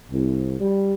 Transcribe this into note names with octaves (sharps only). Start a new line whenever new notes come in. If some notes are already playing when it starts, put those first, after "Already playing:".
C2
G3